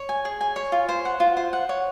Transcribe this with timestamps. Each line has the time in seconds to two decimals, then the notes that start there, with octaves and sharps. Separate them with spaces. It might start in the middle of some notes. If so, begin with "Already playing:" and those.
Already playing: C#5
0.09 G#5
0.25 G#4
0.41 G#5
0.56 C#5
0.72 F4
0.89 C5
1.05 F#5
1.20 F4
1.37 C5
1.53 F#5
1.69 C#5